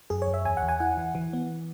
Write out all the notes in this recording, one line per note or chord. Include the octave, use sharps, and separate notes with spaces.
F#2 G#4
C#5
F#2
E5
E2 G#5
F#5
E2
G#5
E4 F#5
E3
E3
B3